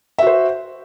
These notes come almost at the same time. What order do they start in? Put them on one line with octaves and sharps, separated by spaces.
E5 F#4 C5